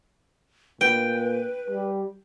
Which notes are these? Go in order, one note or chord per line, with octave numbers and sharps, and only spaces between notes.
A#2 B4 G5
G3